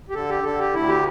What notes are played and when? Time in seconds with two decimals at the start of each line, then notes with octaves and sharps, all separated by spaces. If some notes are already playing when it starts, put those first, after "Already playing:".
0.09 G4
0.14 D3 A4
0.29 G4
0.44 D3 A4
0.59 G4
0.74 D2 E4
0.89 G4